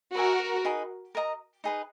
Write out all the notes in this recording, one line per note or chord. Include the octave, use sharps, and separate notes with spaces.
F#4 A#4 B4 E5 G#5
D#4 G#4 B4
A#4 D#5 A#5
D#4 G#4 B4